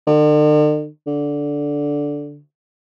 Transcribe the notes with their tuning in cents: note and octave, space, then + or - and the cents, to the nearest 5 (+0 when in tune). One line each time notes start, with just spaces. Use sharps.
D3 +45
D3 -10